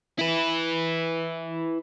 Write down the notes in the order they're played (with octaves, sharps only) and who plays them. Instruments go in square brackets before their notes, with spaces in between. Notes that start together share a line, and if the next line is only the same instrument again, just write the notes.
[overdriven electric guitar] E4 B4